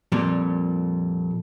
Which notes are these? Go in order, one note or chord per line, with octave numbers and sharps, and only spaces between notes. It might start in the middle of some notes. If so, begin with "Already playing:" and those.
F2 A#2 G3